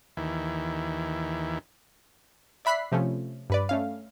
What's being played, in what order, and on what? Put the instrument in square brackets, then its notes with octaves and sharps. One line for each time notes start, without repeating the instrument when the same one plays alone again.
[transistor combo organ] D#2 E3
[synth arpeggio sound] D5 E5 B5 F#6 B6 C7
C3 F3 A3 C#4
G2 B4 D5
A3 C#4 F5